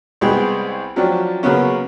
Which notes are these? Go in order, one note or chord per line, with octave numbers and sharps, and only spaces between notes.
C2 G#3 B3 G#4 G5
F3 F#3 C#4 D4 G4
C#3 F#3 A#3 B3 C#4